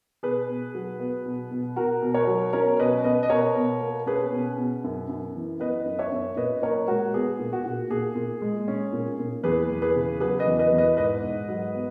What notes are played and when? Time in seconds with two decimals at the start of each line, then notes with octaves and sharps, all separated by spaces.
0.23 B2 G#4 B4
0.49 B2
0.75 F#3
1.00 B3
1.26 B2
1.51 B2
1.76 B2 F#4 A#4
2.02 B2
2.14 A#4 C#5
2.27 F#3
2.53 C#4 A#4 C#5
2.79 B2 B4 D#5
3.04 B2 B4 D#5
3.23 D#5
3.30 B2 A#4 C#5
3.56 B2
3.81 A#3
4.06 C#4 G#4 B4
4.33 B2
4.58 B2
4.84 F#2
5.09 F#2
5.35 E3
5.60 B3 B4 D#5
5.85 F#2
5.99 C#5 E5
6.12 F#2
6.36 A#2 B4 D#5
6.62 A#2 A#4 C#5
6.88 G#3 F#4 A#4
7.14 B3 G#4
7.39 A#2
7.53 F#4
7.66 A#2
7.90 A#2 G#4
8.15 A#2
8.42 G#3
8.68 C#4
8.93 A#2
9.19 A#2
9.43 E2 G#4 B4
9.70 E2
9.82 G#4 B4
9.95 C#3
10.20 F#3 G#4 B4
10.39 B4 D#5
10.46 E2
10.59 B4 D#5
10.72 E2
10.78 B4 D#5
10.97 G#2 B4 D#5
11.23 G#2
11.49 F#3
11.74 B3